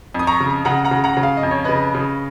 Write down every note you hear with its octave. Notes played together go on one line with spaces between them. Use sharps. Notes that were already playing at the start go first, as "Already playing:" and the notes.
F2 D#6
A#5 C#6
C#3
C#3 F#5 A#5
F#5 A#5
C#3
F#5 A#5
C#3
F5
D#5
F2
C#5
C#3 B4 D#5
C#3